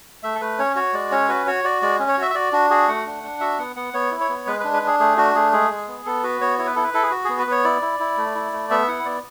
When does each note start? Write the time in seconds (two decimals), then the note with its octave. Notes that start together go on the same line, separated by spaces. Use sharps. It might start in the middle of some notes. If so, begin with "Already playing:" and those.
0.23 A3 E5
0.35 A4
0.41 A3 B4
0.59 C#4 C#5
0.76 F#4 C#5
0.93 G#3 D5
1.12 C#4 C#5
1.29 F#4 B4
1.47 F#4 C#5
1.64 F#4 D5
1.82 G#3 D5
1.99 C#4
2.08 C#5
2.18 F#4 E5
2.30 E5
2.35 F#4 D5
2.53 D4 F#4
2.70 F#4 G#4
2.88 A3 F#5
3.06 D4
3.23 D4
3.40 F#4 E5
3.59 B3 F#5
3.76 B3 F#5
3.94 B3 C#5
4.11 E4
4.20 C#5
4.29 B3
4.47 G#3 B4
4.60 B4
4.65 D4
4.73 B4
4.82 D4 G#4
5.00 A3 G#4
5.17 D4 F#4
5.35 A3 G#4
5.53 G#3 G#4
5.70 G#3
5.88 B3
6.06 B3 A4
6.23 F#4 B4
6.41 B3 C#5
6.59 E4 C#5
6.67 B4
6.76 E4 A4
6.84 B4
6.94 E4 A4
7.03 G#4
7.11 F#4
7.25 B3 G#4
7.38 B4
7.47 B3 C#5
7.64 E4 D5
7.82 E4
8.00 E4
8.17 A3
8.35 E4
8.53 A3
8.70 B3 E5
8.88 E4 F#5
9.05 B3 D5